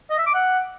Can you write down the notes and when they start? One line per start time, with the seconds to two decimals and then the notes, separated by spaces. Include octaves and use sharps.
0.10 D#5
0.18 E5
0.26 D6
0.34 F#5